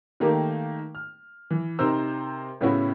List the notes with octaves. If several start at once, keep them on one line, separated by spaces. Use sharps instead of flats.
D#3 A3 A#3 D#4 G4 A#4
F6
E3
C3 D#4 A#4 C5 E6
A2 C#3 B3 C#4 E4 F#4